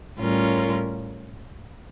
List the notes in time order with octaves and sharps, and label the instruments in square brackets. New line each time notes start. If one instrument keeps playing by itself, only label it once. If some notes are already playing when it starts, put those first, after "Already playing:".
[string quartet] A2 G3 C#4 F4 A#4